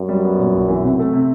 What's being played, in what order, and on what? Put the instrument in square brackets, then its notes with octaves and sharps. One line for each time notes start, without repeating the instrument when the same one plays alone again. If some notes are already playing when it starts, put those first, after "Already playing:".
Already playing: [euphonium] F#2
[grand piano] G3
B3
A#2
B1
E3
C3
A3
C3